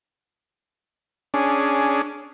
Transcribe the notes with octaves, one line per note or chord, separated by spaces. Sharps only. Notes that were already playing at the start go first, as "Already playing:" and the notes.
C#4 D4 G#4